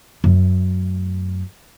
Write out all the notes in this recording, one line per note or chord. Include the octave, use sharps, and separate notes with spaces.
F#2 A3